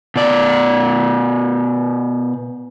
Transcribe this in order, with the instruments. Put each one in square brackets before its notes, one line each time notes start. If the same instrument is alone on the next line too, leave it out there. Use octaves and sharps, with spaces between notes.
[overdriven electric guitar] B2 D5